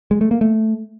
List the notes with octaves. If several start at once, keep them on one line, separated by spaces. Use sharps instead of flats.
G#3
A3
A#3
A3